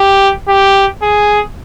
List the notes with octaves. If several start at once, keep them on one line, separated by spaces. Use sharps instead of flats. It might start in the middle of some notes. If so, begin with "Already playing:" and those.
Already playing: G4
G4
G#4